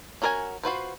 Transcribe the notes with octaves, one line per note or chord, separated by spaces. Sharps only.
C#4 F#4 A#4 D5 G#5
F4 F#4 B4 C5